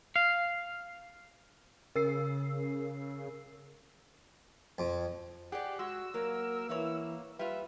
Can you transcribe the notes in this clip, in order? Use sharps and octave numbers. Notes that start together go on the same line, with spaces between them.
F5
C#3 A#4 E6 C7
F2
G4 G#4 D5 F#5
G#3 F#4 E6
F#3 A#3 A#4
E3 B3 E4 C#5
G3 F4 B4 E5